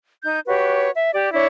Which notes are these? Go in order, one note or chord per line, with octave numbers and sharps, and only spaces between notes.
D#4 G6
F#4 G4 B4 C#5
E5
G4 D5
D4 E4 C#5